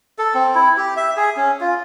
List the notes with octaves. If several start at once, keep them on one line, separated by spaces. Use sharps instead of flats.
A4
C4
E4
G4
E5
G#4
C#4
F4